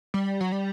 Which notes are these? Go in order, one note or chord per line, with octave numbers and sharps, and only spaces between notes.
G3
F#3
G3